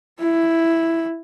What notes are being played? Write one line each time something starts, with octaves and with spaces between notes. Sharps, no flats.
E4